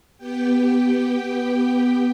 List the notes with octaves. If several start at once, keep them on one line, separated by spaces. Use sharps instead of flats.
B3 G4 G5